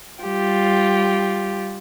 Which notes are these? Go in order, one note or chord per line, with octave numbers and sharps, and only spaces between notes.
G3 F4 G4